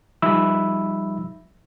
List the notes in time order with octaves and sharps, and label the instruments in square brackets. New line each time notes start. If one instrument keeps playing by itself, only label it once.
[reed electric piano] F3 G3 D#4 E5 B5 E6